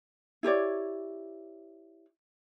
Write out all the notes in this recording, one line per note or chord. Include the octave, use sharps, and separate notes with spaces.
E4 G4 C#5 D5